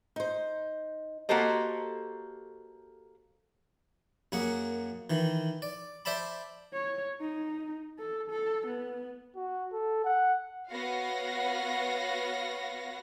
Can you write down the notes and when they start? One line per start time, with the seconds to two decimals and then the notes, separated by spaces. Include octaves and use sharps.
0.16 D#4 C5
1.29 A#3 F#4 G4 A4 C5 D#5
4.32 F#2 A#3 G#4 F#5
5.10 D#3 E3
5.62 D5
6.05 C5 D5 E5 A5 B5
6.73 C#5
7.20 D#4
7.99 A4
8.30 A4
8.66 B3
9.36 F#4
9.72 A4
10.04 F#5
10.70 B3 F#4 C#5 F5 F#5 A#6